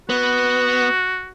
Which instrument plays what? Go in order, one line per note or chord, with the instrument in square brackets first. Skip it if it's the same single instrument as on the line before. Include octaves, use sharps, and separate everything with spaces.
[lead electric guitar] B3 [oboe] F#4